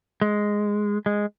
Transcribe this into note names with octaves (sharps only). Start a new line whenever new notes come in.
G#3
G#3